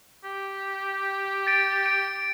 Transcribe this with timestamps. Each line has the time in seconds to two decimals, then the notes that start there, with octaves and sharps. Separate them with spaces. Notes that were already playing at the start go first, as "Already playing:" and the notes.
0.24 G4
1.47 A6 D7
1.86 D7